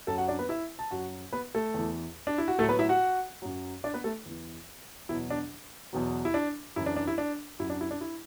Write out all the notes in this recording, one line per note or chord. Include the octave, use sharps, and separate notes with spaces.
F#2 F#3 A4 A5
F#4 F#5
D4 D5
B3 B4
E4 E5
A5
F#2 F#3 F#4 F#5
B3 B4
A3 A4
E2 E3
D4
E4
F#4
A2 F#3 A3 A4
B3 B4
E4 E5
F#4 F#5
F#2 F#3
D4 D5
B3 B4
A3 A4
E2 E3
E2 B2 F#3 E4
D4
E2 B2 F#3
E4
D4
F#2 E3 E4
D4
D4
E4
D4
F#2 F#3 E4
D4
E4
D4
E4